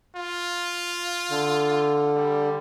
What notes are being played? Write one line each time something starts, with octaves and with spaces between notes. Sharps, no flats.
F4
D3
G3